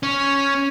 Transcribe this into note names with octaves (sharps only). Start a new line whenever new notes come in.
C#4